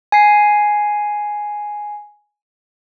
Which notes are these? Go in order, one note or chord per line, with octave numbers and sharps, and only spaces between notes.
G#5 C7